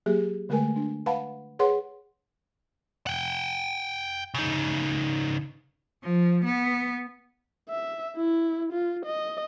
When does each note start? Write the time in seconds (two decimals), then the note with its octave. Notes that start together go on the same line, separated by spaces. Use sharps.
0.06 F#3 A#3 G4 G#4
0.49 D3 G#3 A3 A#4 B4 G#5
0.76 D4
1.06 B4 F5 F#5 A5 B5
1.59 G#4 B4 C#5 F#5 C6
3.07 F#5 G5
4.34 C#3 D#4
6.03 F3
6.45 B3
7.70 E5
8.17 E4
8.73 F4
9.05 D#5